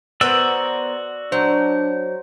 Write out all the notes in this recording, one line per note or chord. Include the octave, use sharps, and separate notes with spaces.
B3 F#4 A#4 C5 D5 E6
F#3 D4 C5